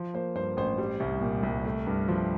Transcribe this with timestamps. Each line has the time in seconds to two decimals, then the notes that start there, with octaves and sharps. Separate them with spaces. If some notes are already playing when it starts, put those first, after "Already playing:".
Already playing: F3
0.14 A#3 C5
0.35 G2 C5
0.57 A1 C5
0.78 G3
1.00 C2
1.21 A#2
1.43 C2
1.65 A3
1.87 G2
2.08 F3